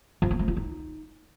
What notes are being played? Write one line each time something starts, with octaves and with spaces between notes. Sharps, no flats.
F3
A#3
A3
F4
D#4